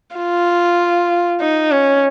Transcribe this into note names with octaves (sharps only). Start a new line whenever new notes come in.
F4
D#4
C#4